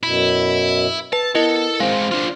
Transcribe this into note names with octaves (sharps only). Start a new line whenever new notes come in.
F#2 B2 E4
B4 A5
B3 E4 A4 A#4 D#5
G#3 C4 C5 F5
D4 F4